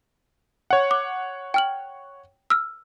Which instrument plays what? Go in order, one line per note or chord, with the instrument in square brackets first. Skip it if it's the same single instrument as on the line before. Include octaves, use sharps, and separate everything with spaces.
[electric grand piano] C#5 F#5
[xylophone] D6
G5 F6 F#7
E6 F6